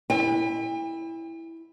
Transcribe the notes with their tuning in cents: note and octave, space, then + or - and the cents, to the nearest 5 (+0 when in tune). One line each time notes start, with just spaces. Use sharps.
E4 +0 G5 +45